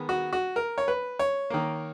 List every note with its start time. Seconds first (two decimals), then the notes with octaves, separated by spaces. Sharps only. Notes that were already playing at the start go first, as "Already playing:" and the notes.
Already playing: D#3 G#3 B3
0.09 F#4
0.33 F#4
0.56 A#4
0.78 C#5
0.88 B4
1.19 C#5
1.50 D#3 A#3